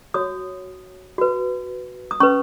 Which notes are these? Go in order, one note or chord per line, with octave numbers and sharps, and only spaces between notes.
F#4 C#5 D#6
F#4 B4
D#6
C#4 B4 C#6